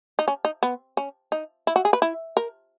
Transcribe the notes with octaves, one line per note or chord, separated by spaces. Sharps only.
D#4
C#4
D#4
B3
C#4
D#4
E4
F#4
G#4
B4
E4
A#4